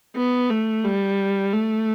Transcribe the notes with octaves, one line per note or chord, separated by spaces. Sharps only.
B3
A3
G3
A3